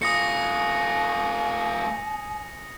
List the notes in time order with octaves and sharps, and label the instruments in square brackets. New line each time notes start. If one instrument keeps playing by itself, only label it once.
[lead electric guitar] A3 F4 [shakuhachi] G#5 [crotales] D#6 A#6 C#7